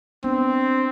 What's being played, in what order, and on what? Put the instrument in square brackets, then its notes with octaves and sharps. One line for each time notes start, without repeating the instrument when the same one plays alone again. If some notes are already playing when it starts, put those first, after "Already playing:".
[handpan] B3 D4 [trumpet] C4